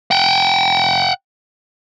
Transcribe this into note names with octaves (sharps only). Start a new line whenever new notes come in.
F#5 G5